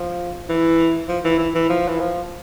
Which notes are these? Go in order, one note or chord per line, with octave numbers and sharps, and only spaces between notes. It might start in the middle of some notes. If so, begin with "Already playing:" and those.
Already playing: F3
E3
F3
E3
E3
E3
F3
E3
F3